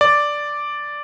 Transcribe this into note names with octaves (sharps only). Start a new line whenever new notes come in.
D5